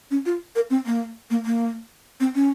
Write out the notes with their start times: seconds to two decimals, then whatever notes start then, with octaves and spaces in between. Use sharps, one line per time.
0.11 C#4
0.26 F4
0.56 A#4
0.70 C4
0.86 A#3
1.30 A#3
1.46 A#3
2.20 C4
2.35 C#4